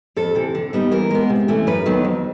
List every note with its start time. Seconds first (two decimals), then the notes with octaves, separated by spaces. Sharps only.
0.16 F2 A4
0.35 C3 E3
0.55 D3
0.73 G3 B3 D#4
0.91 E3 A#4
1.11 G#3 B3
1.29 C3
1.48 E3 A3 C#4
1.67 F#2 B4
1.86 D#3 F#3 B3
2.04 F2